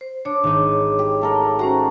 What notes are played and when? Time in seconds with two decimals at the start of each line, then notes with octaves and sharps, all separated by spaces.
0.01 C5
0.25 D4 C#5 D6
0.44 G#1 D#4
0.99 G4
1.22 A3 A4 A#4
1.59 C#4 F#4 C5 A#5